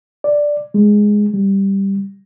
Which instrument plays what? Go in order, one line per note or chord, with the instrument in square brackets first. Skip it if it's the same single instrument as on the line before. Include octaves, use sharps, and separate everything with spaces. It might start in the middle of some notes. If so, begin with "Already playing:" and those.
[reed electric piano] D5
G#3
G3